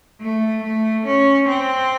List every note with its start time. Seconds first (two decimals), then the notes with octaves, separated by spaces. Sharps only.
0.21 A3
0.63 A3
1.06 C#4
1.48 C4